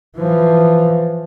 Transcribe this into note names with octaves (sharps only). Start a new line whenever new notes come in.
E3 F3